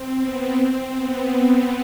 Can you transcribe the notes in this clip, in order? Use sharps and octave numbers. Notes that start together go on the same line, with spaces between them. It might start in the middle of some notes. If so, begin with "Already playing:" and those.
Already playing: C4
B3
C4
B3